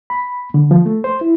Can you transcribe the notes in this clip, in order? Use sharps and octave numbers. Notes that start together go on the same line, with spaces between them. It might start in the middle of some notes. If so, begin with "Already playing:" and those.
B5
D3
F3
A3
C5
E4